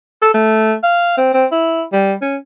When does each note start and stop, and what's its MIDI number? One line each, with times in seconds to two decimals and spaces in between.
0.22 0.30 69
0.34 0.75 57
0.83 1.15 77
1.17 1.33 60
1.34 1.45 60
1.52 1.83 64
1.93 2.14 55
2.22 2.36 61